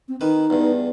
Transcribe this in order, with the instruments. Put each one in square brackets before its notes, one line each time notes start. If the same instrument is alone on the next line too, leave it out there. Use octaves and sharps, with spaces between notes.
[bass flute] C4
[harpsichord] D#3 B4 [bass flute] D#4
[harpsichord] E2 G2